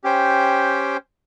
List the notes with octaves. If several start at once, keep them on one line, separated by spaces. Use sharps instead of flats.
C#4 G4 C5 G5